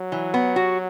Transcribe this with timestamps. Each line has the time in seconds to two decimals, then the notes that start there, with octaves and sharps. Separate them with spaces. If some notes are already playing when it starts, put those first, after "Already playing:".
Already playing: F#3
0.12 E3
0.34 B3
0.56 F#4